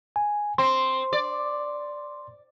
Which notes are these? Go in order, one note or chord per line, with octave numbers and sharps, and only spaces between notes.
G#5
C4 C6
D5